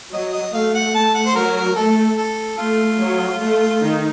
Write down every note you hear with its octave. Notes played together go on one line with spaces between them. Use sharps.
F#3 D#5
D#5
A3 F5
F#5
A3 A5
F#5
C5
F#3 A#4
A#4
A3 A4
A4
A3 F4
F#3
A3
D#3 D#4